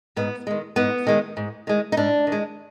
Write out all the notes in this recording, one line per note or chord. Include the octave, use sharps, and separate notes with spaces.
G#2 B3
D#3 G#3
G#2 B3
D#3 G#3
G#2
D#3 G#3
D#4
G#2 D4
D#3
G#3